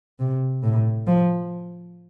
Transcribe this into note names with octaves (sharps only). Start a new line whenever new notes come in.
C3
A2
F3